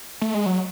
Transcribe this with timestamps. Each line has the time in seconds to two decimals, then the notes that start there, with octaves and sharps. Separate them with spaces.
0.22 A3
0.34 G#3
0.46 F#3